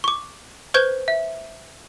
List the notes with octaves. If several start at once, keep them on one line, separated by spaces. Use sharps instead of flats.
C#6 D6
B4 C5 C#6 G6 G#6
E5